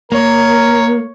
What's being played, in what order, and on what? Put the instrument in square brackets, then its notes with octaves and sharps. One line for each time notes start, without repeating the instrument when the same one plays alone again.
[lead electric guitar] A#3 [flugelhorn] A#4 [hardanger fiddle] C#5